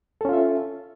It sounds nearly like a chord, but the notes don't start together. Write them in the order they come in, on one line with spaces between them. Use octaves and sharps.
A4 C#4 F4 E5